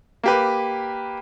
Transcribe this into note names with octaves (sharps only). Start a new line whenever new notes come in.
A#3 G4 B4